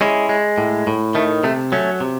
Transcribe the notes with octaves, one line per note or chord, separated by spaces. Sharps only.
G#3 C#4 E4
G#3
A2
A2
D#3 A3
C3 A3
F#3 A3 C#4
C3